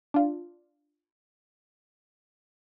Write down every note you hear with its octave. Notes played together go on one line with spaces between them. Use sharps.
D4 F4